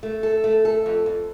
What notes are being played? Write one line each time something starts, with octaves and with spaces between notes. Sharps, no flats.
A3
A4
A3
A4
F2
F2